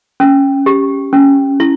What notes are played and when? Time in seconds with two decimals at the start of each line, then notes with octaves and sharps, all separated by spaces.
0.20 C#4
0.66 G4
1.13 C#4
1.60 E4